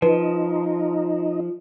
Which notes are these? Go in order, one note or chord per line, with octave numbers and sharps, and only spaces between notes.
F3 D#4 B4